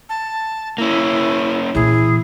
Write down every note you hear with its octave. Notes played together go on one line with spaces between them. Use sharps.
A5
A#3 C#4 E4
A#2 E3 E4 G#4